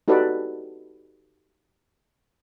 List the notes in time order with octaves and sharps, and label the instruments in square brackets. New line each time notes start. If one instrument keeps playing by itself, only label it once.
[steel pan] D#4 F#4 G4 A4 B4 D5